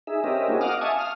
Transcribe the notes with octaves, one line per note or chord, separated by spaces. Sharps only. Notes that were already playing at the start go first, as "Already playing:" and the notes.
D#4 G#4 E5
C4 C#4 G4 A#4 D#5 E5
A#3 C4 C#4 E4 F#4 G#4
D#5 F5 F#5 D6 D#6 F6
E5 F5 G#5 A5 C#6 D#6
F5 D#6 F6